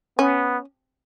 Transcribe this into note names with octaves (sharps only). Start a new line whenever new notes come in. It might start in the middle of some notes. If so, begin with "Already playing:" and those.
B3 C#4